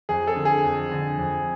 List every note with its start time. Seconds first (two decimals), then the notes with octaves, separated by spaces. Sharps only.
0.09 F2 G#4
0.27 A4
0.36 D3
0.45 G#4
0.64 F2
0.92 D3
1.18 F2